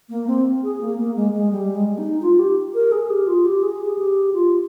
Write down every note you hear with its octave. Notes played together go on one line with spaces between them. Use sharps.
A#3
C4
G#4
A#3
A#3
G#3
G#3
G3
G#3
D#4
F4
G4
A#4
G#4
G4
F4
G4
G#4
G4
F4